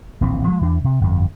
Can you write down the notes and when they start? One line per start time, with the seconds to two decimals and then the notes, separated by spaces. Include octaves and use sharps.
0.21 D1 A#1 E3 C4
0.47 F3 F#3 G#3
0.61 E2 E3 D4
0.84 C3
1.01 G1 F2